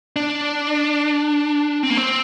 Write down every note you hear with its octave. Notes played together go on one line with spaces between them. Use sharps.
D4
C4
A#3
C4